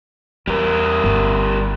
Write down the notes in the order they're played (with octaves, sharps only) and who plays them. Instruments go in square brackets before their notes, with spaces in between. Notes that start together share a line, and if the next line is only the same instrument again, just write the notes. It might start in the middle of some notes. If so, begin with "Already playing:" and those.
[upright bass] E2 [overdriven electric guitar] G3 A#4
[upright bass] G1